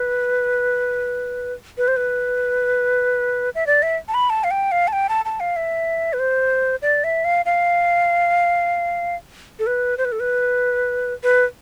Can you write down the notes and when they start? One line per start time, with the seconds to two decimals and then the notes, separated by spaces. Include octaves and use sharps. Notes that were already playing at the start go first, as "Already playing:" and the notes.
Already playing: B4
1.78 B4
1.88 C5
1.97 B4
3.55 E5
3.67 D5
3.83 E5
4.08 A5
4.14 B5
4.30 A5
4.44 F5
4.51 G5
4.72 F5
4.88 A5
4.93 G5
5.09 A5
5.25 A5
5.40 F5
5.56 E5
6.13 B4
6.19 C5
6.82 D5
7.04 E5
7.25 F5
7.46 F5
9.59 A4
9.67 B4
9.98 C5
10.05 B4
10.12 A4
10.20 B4
11.23 B4